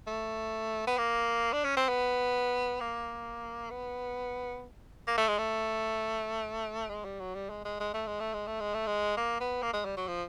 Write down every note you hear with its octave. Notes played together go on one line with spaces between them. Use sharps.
A3
B3
A#3
D4
C#4
C4
B3
A#3
B3
A#3
A3
G#3
A3
G#3
G3
F#3
G3
G#3
G#3
G#3
A3
G#3
A3
G#3
A3
G#3
A3
G#3
A#3
B3
A#3
G#3
G3
F#3
F3